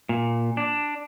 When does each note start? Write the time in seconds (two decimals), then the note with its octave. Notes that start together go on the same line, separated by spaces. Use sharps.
0.09 A#2
0.57 D4